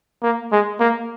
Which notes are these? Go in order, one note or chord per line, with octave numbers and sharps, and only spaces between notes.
A#3
G#3
A#3